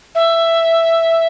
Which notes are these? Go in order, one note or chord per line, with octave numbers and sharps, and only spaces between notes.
E5